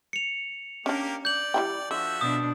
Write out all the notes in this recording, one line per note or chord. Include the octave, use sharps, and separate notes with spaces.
C#7 F7
A#3 C#4 D4 G4 A#4
D5 G6 F#7
G3 E4 G5
D3 F3 F#4 E5
B2 D4 D#6